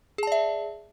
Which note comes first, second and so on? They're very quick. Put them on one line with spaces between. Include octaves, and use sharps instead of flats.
G#4 A5 D5 E5